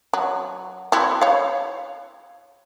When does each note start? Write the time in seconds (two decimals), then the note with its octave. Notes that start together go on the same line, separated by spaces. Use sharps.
0.13 F#3
0.92 C4 E4 F#4
1.21 C#5 F5